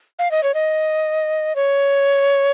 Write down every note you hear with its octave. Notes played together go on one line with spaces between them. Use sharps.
F5
D#5
C#5
D#5
C#5